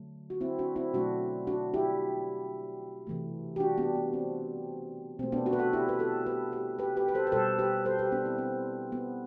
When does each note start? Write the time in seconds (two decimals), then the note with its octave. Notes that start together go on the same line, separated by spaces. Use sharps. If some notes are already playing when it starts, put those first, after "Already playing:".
Already playing: D3 F#3 A3
0.30 F#4
0.41 C4 E4
0.59 D4 F#4
0.76 C4 E4
0.94 B2 F#3 A3 D4 F#4
1.47 D4 F#4
1.74 E4 G4
3.07 C3 E3 A3
3.56 G4
3.60 D4 F#4
3.77 B3 D4
3.95 B3
4.13 C4
5.19 B2 C4
5.23 A3
5.32 B3 D4
5.46 D4 F#4
5.53 B4
5.59 F#4 A4
5.73 E4 G4
5.89 B4
5.99 F#4 A4
6.26 G4 B4
6.52 G4 B4
6.79 G4 B4
6.97 G4 B4
7.08 B4
7.15 A4 C5
7.27 B4
7.32 B2 G3 A4 C5
7.59 G4 B4
7.85 A4 C5
7.99 G4 B4
8.12 B3 D4
8.25 C4 E4
8.38 C4
8.92 B3